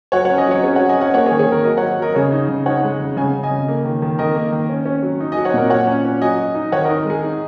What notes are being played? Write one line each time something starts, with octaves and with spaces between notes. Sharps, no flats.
F#3 C#5 F#5
C#5 F#5
C#4
D#5 G#5
F#3 C#5 F#5
C#4 G#4 C#5
C#5 F#5
F#3
D#5 G#5
C#4 C#5 F#5
A#3 C#5 F#5
G#4 C#5
D#3
G#4 C#5
D#3 A#4
F#3 A#4 D#5
C#5 F#5
F#3
F#3 A#4 D#5
C#3 G#4 C#5
D#4
C#3
D#4 C#5 F#5
G#3
C#3
C#3 G#5
C#3
D#5 G#5
C#3
A#3
D#3
D#3
D#3 A#4 D#5
A#3
D#3
C#4
C#4
F#3
D#4
D#5 G#5
F#3
C#5 F#5
A#2 A#4
F#3 C#5 F#5
C#4
C#4
F#3 D#5 G#5
F#3
D#4
D#3 C#5 F#5
A#4 D#5
D#4
A#4
G#3 G#4
D#4